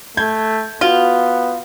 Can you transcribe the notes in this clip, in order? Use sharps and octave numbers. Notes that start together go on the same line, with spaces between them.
A3 G6 G#6
B3 F4 F#4